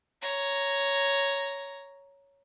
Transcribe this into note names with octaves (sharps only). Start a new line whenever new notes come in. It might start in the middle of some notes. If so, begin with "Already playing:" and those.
C#5 A#5